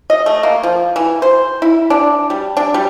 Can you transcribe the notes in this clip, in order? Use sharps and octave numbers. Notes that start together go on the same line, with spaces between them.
D#5
A3
A#3
F3
E3
C5
E4
D4
G3
D4
G3